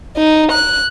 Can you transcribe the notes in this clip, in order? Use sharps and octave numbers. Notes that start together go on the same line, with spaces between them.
D#4
F#6